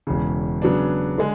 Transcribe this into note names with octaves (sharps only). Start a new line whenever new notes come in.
E1 E2 C#3
C#3 F#3 B3 D4
D3 G#3